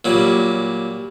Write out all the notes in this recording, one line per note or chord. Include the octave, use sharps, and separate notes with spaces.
A#2 F#3 G3